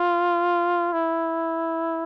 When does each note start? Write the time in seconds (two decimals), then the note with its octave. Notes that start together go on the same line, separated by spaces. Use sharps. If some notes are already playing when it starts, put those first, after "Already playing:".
Already playing: F4
0.93 E4